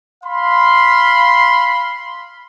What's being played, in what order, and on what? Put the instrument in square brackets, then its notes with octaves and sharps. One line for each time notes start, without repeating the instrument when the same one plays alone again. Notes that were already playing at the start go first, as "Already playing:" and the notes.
[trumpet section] F5 B5 C6